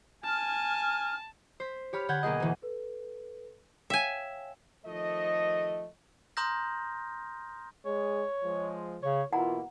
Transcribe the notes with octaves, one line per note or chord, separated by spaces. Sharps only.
G#5 A5 F6
C5 B6
G4 C#5 B5 F6
D3 A4 F#5 B5 G6 G#6
B1 A#3 G#4 D#5
D2 E3
A4 B4
C#5 E5 F5 G5 G#5
D#3 F3 A3 A4 D#5
A#5 C6 D#6 F6 G6 A#6
G#3 G#4 C#5
F3 G#3
C#3 C#5
B2 E3 A#3 E4 F4 F#5 A#5